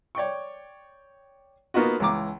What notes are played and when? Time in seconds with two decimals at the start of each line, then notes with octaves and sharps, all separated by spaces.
0.15 C#5 D5 G5 C#6
1.74 A#3 B3 D#4 F4 F#4
2.00 C#2 E3 A#5 D6